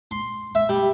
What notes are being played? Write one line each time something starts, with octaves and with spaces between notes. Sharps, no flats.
C6
E5
G3